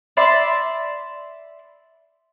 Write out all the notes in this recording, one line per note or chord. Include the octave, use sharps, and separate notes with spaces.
D5 E5 B5 C6